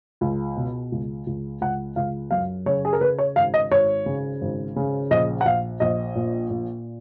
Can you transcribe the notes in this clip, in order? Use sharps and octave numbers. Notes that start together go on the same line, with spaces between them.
C#2
B2
C#2
C#2
C#2 F#5
C#2 F5
F#2 F5
C#3 C#5
G#4
A#4
C#3 B4
C#5
G#1 F5
D#5
G#1 C#5
C#3
G#1
C#3
A#1 D#5
F#5
A#1 F5
A#1 D#5
A#2
A#2